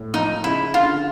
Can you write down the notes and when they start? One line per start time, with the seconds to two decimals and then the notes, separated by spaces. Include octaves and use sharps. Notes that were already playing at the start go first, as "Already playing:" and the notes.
Already playing: A2
0.14 F3 D#4
0.44 C#3 E4
0.74 D3 F4